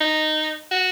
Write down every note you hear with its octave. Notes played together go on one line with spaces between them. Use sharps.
D#4
F#4